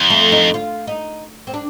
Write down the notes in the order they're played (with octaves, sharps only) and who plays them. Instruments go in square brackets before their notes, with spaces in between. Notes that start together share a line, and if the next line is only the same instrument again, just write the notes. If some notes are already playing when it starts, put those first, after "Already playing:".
Already playing: [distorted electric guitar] F2
[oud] A3
D#4
F4
D#4
C4
D4